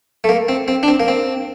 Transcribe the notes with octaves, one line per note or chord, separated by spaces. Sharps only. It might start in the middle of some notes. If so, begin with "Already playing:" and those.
A3
A#3
C4
C4
D4
C4
A#3
C4